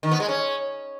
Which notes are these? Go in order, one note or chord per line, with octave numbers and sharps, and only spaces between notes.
D#3
B3
G#3
C#4